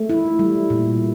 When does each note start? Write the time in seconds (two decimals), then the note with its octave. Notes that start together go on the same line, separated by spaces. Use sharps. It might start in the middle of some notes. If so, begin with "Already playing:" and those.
Already playing: A3
0.10 E4
0.39 G3
0.70 A#2